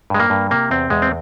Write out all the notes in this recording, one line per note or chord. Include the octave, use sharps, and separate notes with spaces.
G2 G#3
A#3
G2
C3 A#3
E2 C4
E2 G#3
C4